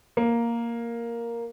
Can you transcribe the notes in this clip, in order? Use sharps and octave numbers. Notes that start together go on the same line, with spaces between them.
A#3